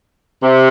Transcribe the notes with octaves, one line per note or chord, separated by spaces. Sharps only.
C3